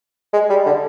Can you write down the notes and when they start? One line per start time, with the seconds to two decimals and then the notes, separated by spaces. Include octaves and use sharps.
0.33 G#3
0.49 G3
0.66 D3